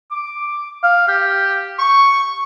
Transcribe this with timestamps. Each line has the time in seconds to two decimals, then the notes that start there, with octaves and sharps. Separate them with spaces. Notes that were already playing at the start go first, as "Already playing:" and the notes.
0.11 D6
0.83 F5
1.08 G4
1.79 C#6